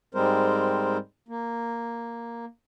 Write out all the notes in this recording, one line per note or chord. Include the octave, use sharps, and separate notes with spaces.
G#2 G3 G#3 C4 A#4 C5
A#3